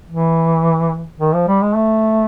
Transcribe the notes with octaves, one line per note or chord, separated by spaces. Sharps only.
E3
D#3
F3
G3
G#3
A3